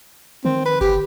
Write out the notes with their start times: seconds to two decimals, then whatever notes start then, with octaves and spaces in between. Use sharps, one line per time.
0.45 D#3 C4
0.66 B4
0.81 G1 G4